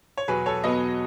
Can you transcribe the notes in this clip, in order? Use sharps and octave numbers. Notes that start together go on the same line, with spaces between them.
C#5
E2 B2 F#3 G#4 B4
A4 C#5
E2 B2 F#3 B4 D#5